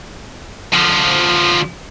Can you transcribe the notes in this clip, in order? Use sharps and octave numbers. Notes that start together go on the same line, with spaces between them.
D3 F3